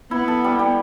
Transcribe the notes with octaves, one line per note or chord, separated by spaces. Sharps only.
B3 E4
A4
G3
G3